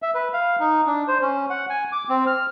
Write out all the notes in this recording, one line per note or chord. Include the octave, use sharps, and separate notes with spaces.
E5
B4
F5
D#4
D4
C5
C#4
F#5
G#5
D6
C4
F6